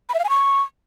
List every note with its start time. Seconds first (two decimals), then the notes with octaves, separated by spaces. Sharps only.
0.09 B5
0.14 E5
0.19 F5
0.24 G#5
0.29 C#6